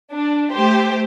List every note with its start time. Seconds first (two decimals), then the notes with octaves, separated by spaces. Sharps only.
0.12 D4
0.52 A3 G4 C5